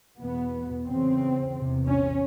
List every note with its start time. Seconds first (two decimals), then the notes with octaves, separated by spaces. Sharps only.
0.19 E2 B2 B3
0.86 E2 C#3 C4
1.53 E2 C3
1.86 C#4